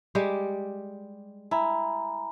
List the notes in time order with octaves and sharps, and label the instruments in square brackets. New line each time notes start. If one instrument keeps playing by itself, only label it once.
[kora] G3 G#3 G4
[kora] E4 [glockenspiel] G#5 A#5 B5